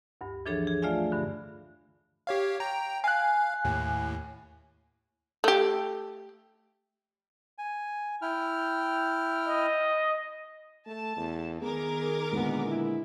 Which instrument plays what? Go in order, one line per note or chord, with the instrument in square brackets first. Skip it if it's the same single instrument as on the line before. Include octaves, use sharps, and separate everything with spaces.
[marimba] D2 G2
E3 F3 D4 G#4 A4 C#5
G#4
A3 F4 D5 E5 F5 G#5
G2 D3
[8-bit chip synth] G4 C#5 F5
G5 A#5
[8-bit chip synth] F5 [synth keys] G#5 F#6
[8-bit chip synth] D#2 A2
[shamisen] A3 G4
[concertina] G#5
E4 G5 F6
[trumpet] D#5
[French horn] A3 [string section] A5
[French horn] E2
[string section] D#3 A#4 D6 [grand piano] B3 [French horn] G#4
[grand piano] A#2 D3 G#3 [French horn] B3
[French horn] E4